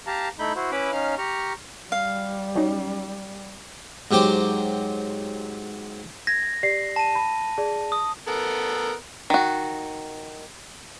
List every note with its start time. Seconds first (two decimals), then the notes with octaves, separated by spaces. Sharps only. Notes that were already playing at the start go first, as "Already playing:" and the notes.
0.07 G4 F5 A5 A#5
0.39 A3 D#4 E4 B5 G6
0.56 E4 F#4 C5
0.72 C#4 E4 B4 E5 B5 D6
0.92 C#4 D#4 F5 F6
1.18 G4 A#5 C#6 F6
1.92 G3 F5
2.55 F#3 C#4 D#4
4.11 G#2 F#3 G4 C5 D6
6.27 G#6 A#6
6.63 G4 D5 C7
6.96 A5 D#7
7.15 B5
7.58 G#4 D5
7.92 D#6
8.27 B3 A4 A#4
9.30 D#3 F#4